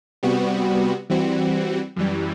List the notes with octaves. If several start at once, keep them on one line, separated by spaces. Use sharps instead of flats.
C3 G3 B3 F#4
E3 G3 C4 F#4
F#2 E3 G3